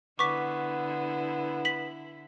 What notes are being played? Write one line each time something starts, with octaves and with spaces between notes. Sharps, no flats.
D3 B3 E4 C#6 D6 B6
B6 F#7